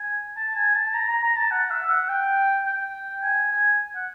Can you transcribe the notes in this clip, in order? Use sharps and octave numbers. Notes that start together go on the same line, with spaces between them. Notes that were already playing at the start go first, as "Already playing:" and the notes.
Already playing: G#5
A5
G#5
A5
A#5
A#5
A#5
A5
F#5
E5
F#5
G5
G5
G#5
G#5
F#5